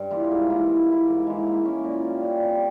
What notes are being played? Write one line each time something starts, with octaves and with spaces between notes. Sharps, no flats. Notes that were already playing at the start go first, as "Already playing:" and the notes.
Already playing: G2
E3 A#3 F4
G#2
E3 A#3 E4
E3
A#3 E4
G#2
E3 G#3
A#3
C#4 E4
A#2
G3 C#4
G3
C4 G4 A#4